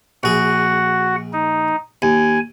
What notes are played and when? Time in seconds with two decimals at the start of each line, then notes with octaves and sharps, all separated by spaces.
0.23 A#1 F#4 G#4 F#5
1.33 D#4
2.02 D#2 G#5